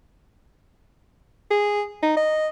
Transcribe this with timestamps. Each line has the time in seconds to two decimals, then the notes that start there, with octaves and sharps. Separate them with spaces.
1.51 G#4
2.03 D#4
2.17 D#5